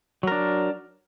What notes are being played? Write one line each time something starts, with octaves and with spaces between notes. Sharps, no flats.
F#3 D4 A#4